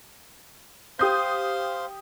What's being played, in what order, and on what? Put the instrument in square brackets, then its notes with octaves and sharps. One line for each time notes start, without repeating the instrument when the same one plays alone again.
[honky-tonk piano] G4 D#6 G6 [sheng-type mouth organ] C5 F5 C6